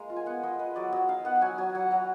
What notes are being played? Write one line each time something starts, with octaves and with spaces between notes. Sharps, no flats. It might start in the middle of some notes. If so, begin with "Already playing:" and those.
Already playing: G#3 A#3 A#5
F4
G#5
B3 F#5
G#3 D#5
G#3 B4
F#3 D5
F#3 D#5
D#4 F5
B3 F#5
F#5
F#3 G#5
F#3 G#5
F#3 F#5
F#3 A#5